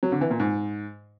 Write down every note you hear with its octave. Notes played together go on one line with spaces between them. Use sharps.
F#3
D3
E3
A#2
G#2